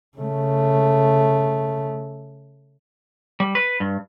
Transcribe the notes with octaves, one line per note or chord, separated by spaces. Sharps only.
C#3 A3
G3
B4
G2